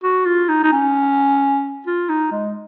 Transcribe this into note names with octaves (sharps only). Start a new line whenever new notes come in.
F#4
F4
D#4
D#4
C#4
F4
D#4
G#3